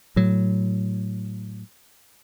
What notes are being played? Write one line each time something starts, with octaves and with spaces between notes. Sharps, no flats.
A2 F#3